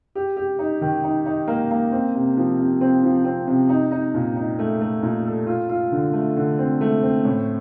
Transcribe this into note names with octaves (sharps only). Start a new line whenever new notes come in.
G4
G4
D#4
D#3
D#4
D#4
A#3
A#3
C4
C3
F3
C3
C4
F3
C4
C3
D#4
D#4
A#2
D#4
A3
A3
A#2
A4
F4
F4
D3
A3
D3
C4
A3
C4
A2